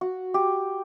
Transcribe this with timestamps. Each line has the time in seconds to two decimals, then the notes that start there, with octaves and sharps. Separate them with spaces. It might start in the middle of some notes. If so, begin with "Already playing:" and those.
0.01 F#4
0.34 G4